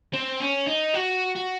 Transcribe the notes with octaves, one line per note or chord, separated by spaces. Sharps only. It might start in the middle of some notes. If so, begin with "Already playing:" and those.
C4
C#4
D#4
F#4
F#4